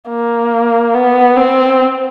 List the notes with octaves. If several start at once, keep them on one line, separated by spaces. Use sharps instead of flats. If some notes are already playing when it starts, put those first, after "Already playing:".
A#3
B3
C4